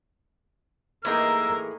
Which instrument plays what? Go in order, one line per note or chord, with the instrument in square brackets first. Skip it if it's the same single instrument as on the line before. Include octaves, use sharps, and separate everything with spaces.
[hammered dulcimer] A2 D#4 [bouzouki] E3 G#4 G5 [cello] A#3 A#4 [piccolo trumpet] E6